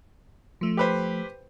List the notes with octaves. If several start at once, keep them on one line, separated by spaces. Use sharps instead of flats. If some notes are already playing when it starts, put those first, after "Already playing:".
F3 A3
G4 B4 C5